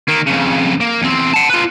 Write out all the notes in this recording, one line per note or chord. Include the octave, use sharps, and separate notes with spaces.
D#3 A#3
F2 C#3
A#3
E2 C4
F#5 A5
F4 B4